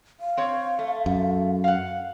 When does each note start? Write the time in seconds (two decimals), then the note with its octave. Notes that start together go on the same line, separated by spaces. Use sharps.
0.20 F5
0.37 C4 C#5
0.79 A3
1.06 F#2
1.64 F5 F#5